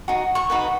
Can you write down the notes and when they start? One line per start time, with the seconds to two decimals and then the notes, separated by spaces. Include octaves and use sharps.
0.08 D#4 F#4
0.35 C#6
0.50 D#4 F#4 B4